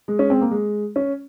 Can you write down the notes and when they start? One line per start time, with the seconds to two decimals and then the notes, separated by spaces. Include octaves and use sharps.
0.08 G#3
0.19 C#4
0.30 C4
0.41 A#3
0.51 G#3
0.96 C#4